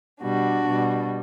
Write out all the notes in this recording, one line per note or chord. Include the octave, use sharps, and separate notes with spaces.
B2 G3 D4 F#4
B2 G3